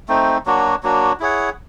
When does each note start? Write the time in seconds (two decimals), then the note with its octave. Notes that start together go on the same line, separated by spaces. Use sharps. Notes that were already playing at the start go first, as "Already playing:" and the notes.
0.08 A3 C4 D#4
0.46 F#3 A#3 D4 F#4
0.83 F#3 A#3 D4 F#4
1.20 E4 G#4 C#5 F#5